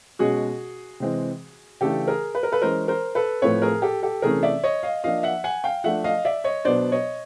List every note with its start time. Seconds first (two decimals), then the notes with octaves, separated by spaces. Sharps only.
0.19 B2 G#3 C#4 F#4 G#4
1.00 C3 E3 G#3 C4
1.81 C#3 E3 A3 D4 G4 A4
2.08 G#4 A#4
2.35 B4
2.43 A#4
2.52 A4 B4
2.61 E3 G#3 C#4 A#4 C5
2.88 A#4 C5
3.15 A4 B4
3.42 A2 F3 A3 C4 B4 C#5
3.62 G#4 A#4
3.82 G4 A4
4.03 G4 A4
4.22 C3 E3 A3 C#4 G#4 A#4
4.43 D5 E5
4.64 C#5 D#5
4.83 D#5 F5
5.04 F3 A#3 D4 D#5 F5
5.23 E5 F#5
5.44 F#5 G#5
5.64 F5 G5
5.84 F3 A3 D4 E5 F#5
6.04 D#5 F5
6.25 D5 E5
6.44 C#5 D#5
6.65 B2 F#3 B3 D4 C5 D5
6.92 C#5 D#5